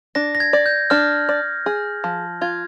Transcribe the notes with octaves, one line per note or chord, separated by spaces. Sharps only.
D4 A#6
A#6
G#6
D5
G6
D4 F6
D5
G#4
F3
F4 G#6